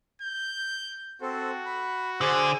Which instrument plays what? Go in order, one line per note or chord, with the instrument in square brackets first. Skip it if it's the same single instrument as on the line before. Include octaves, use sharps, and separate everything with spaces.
[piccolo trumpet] G6
[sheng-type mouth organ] C4 A4 C5 [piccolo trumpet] F#4
[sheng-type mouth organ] B5
[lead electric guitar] D3 [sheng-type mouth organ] G#4 C5